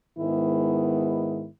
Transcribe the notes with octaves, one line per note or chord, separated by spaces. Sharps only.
G#2 D#3 G#3 B3 E4